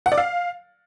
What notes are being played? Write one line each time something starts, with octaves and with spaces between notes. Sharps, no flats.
F#5
D5
F5